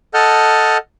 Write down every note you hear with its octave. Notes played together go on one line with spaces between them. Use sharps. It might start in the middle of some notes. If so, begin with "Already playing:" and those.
A4 D#5 F#5 A5 F6 G6